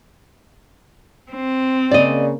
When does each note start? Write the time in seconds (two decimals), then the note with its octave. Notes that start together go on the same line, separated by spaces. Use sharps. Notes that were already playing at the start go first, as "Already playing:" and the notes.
1.32 C4
1.91 C#3 A#3 D5 D#5